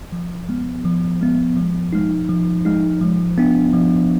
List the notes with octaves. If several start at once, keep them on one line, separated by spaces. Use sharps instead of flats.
F3
G#3 B3
F3
G#3 B3
F3
G#3 D#4
F3
G#3 D#4
F3
B3 D4
F3